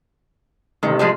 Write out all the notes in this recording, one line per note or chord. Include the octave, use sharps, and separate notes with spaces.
A1 C3 D#3
F3 G3 G#3